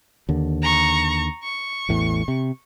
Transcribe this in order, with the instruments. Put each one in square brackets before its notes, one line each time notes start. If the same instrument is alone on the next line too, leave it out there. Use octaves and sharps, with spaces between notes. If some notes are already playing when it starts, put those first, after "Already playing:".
[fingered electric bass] D#2 D3
[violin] A#5 C#6
C#6
[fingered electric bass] A1 E2 A2
C3